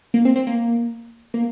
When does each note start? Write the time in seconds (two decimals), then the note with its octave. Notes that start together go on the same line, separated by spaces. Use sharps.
0.14 A#3
0.25 C4
0.36 C4
0.47 A#3
1.34 A#3